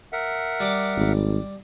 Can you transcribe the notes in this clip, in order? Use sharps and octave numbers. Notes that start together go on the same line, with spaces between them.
A#4 E5 F#5
G3 D6
G#1